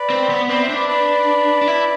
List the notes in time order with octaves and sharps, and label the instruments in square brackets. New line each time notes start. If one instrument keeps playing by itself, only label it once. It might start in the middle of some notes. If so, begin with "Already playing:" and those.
Already playing: [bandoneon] B4 D5
[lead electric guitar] C4
B3
[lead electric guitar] C4 [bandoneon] B4 D5
[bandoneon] C5 E5
[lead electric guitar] D4
[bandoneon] B4 D5
B4 D5
[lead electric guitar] D4
E4